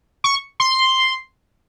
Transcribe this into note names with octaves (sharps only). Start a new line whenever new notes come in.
C#6
C6